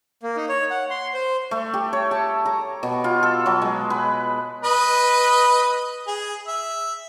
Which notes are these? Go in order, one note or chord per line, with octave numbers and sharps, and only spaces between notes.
A#3
D#4
C#5
F#5
C6
C5
A3
G4
C#5
A5
A#5
B2
F4
A4
F#3
G#3
B4
B4 D#5
G#4
E5